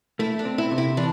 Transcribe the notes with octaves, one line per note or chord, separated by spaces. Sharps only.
A3 E4
D4
C4
E4
C3
E4
E3 D4